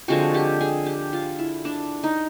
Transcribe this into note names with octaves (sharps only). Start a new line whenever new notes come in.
D3 F3 G#3 C4 F#4
G4
G#4
G4
F4
E4
D4
D#4